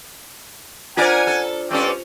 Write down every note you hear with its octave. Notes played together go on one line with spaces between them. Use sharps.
D4 F4 A#4 C5 D5 F#5 G#5
A4
G2 C4 C#4 A4 D5